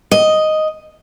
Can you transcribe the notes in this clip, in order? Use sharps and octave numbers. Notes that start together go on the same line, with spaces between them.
D#5